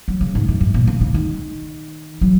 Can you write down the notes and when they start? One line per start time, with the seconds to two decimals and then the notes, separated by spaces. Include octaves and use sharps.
0.08 F#3
0.21 C#3
0.35 G#2
0.48 F#2
0.61 G#2
0.74 A#2
0.87 C#3
1.01 C#3
1.14 D#3
2.21 F#3